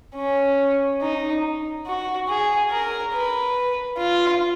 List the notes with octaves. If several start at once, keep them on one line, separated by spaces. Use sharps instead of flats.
C#4
D#4
F#4
G#4
A#4
B4
F4